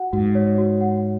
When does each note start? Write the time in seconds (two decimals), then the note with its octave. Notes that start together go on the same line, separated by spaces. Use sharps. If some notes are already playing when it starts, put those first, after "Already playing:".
Already playing: F#4 F#5
0.13 G#2 F#4
0.35 C#5
0.58 F#4
0.81 F#5